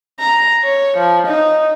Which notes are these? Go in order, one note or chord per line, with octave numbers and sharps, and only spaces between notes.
A#5
C#5
F3
D#4